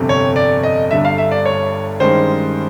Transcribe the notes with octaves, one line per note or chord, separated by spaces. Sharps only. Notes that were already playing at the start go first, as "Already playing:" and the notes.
Already playing: G1 F2 C3
C#5
D5
D#5
G1 G2 D3 E5
F5
E5
D5
C#5
G2 D#3 G#3 C#4 C5